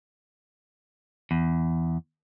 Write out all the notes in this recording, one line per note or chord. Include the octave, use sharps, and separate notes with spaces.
E2